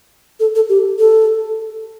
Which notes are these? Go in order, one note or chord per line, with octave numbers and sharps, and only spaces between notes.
A4
A4
G4
A4